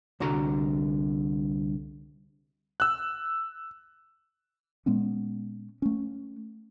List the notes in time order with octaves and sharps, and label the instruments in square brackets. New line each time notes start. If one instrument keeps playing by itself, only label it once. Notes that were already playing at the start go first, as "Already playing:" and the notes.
[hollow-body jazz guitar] C2 D3 F#4 A#5
[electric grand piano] E6 F#6
[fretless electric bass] A#2 G#3 B3 C#4
A3 C#4